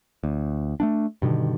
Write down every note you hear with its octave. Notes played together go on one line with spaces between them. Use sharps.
D2
A3 A#3 D4
G2 B2 D3 D#3